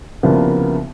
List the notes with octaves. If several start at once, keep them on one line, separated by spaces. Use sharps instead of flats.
C2 C#3 F3 A#3 B3